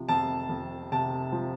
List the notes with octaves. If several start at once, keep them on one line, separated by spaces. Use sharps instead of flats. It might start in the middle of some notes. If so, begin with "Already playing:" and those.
Already playing: C3 F3
F2 A5
F2
C3 A5
F3